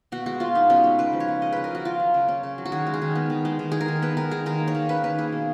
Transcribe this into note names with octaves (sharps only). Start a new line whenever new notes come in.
B2 F#4
G#3 F#4
B2 F4
B3 D#4
B2 C#4
G#3
C#3 B4
F3
C#5
C#3
G#3 D#5
C#3 B4
A#4
F3 F#4
C#3 F4
F#3
C#3
C#4
C#3
F#3
F#4
D#3 G#4
G#3
G#4
D#3
B3
D#3
G#3
D#3
G#3 G#4
A#4
D#3
B3 B4
D#3 A#4
G#3 G#4
D#3 A#4
A#3
C#5
D#3
C#4 B4
D#3 B4
A#3 G#4
B2